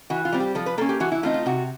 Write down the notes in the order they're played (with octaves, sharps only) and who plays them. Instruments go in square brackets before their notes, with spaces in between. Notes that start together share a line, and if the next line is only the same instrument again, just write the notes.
[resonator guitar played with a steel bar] E3 F#4
F4
G3 C4
G4
F3 A4
B4
A#3 A4
C#4
G4
E3 F#4
E4
A3 C4 D#4 F4
F4
C3 F#4